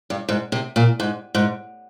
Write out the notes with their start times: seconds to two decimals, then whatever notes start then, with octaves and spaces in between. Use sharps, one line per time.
0.10 G2
0.29 G#2
0.52 C3
0.76 A#2
1.00 G#2
1.35 G#2